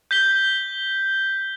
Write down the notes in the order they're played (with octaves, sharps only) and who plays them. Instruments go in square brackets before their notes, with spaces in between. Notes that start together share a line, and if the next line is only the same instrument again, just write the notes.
[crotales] G6 B6 G7